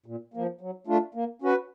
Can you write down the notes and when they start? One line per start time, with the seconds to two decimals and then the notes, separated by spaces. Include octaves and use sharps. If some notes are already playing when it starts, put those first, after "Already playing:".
0.06 A#2
0.34 F3 A#3
0.61 F#3
0.87 A3 D4 F4
1.14 A#3
1.42 C#4 F#4 B4